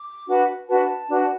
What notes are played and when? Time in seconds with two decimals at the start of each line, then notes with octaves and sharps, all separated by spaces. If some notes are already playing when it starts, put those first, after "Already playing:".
Already playing: D6
0.28 D4 F#4 B4
0.68 D4 F#4 B4 A5
1.09 D4 F#4 B4